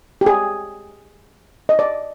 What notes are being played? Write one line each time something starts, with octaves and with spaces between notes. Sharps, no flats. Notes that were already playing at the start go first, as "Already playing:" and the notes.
G4
G#4
D#5
D5